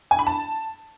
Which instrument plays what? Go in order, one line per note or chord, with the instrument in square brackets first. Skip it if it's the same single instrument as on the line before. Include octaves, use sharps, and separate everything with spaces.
[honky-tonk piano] G#5
B5
A5